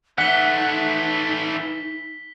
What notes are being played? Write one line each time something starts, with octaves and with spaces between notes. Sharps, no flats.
E3 A3 D#4 F#5 B6 G7